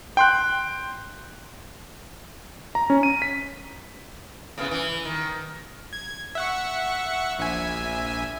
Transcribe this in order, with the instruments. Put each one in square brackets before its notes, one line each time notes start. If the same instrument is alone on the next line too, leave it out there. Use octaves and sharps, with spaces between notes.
[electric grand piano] G5 C6 F#6
A#5
C#4
D#7
B6
[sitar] A2 C#3 B3
E3
D#3
[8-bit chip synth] G#6
E5 F#5 C#6
A#1 E5 G#5